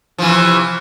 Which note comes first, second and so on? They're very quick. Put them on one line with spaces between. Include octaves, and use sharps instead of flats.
F3 E3 C3